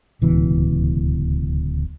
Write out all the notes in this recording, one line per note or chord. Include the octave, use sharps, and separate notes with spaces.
D1 C#2 B2 E3